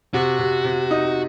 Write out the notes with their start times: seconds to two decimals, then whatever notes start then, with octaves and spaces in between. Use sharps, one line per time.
0.14 C3 F#4
0.39 C3
0.64 C3
0.91 D#4